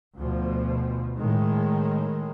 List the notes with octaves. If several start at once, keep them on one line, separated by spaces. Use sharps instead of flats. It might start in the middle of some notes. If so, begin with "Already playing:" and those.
D2 B2 F3
A2 D#3 G#3